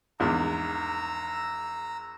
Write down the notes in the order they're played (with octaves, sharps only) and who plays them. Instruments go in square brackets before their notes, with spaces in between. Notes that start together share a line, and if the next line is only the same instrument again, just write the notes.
[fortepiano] A#1 E2 G#2 [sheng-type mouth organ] A#5 E6